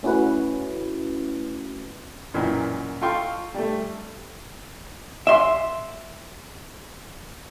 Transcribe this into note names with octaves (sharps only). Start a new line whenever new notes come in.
A3 C#4 E4 F#4 B4
F#2 A#2 D#3 E3
F4 A4 F5 G5 C6 C#6
G3 A3
E5 C6